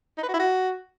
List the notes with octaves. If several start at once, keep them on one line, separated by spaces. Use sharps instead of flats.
D#4
B4
F#4
E4
F#4